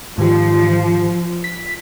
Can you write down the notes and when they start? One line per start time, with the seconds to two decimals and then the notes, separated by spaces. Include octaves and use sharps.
0.18 G#2 D#3 F3 G4
1.44 B6